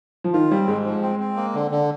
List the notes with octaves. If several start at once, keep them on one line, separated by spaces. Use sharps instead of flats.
F3
D#3 F4
G3 C4
G#2 G#3
F3
C4
C4
A#3
D3
D3